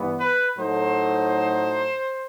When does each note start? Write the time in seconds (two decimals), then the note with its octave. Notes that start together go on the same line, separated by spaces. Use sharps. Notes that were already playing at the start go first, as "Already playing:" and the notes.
Already playing: G2 E3 B3
0.18 B4
0.58 A2 F#3 A3 D#4 C5